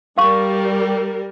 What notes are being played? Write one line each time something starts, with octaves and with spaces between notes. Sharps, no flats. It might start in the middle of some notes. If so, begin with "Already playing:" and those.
G3 A#4 F5 C#6